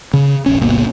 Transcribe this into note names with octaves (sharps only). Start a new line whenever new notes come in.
C#3
E1 A#1 C#4
D1 G1 B2 A#3